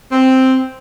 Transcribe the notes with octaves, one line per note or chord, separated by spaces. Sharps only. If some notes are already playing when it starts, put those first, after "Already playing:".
C4